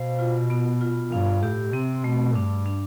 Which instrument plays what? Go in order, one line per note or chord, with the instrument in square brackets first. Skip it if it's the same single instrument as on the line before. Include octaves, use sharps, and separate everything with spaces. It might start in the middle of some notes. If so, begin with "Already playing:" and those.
Already playing: [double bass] B2 [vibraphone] C5 F5
[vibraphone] F4
B3
F4
[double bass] G2 [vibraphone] F5
[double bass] A2 [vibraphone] G4
[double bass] C3 [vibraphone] C4
[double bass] B2 [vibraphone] A3
[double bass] G2 [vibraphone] D4
[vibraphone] D4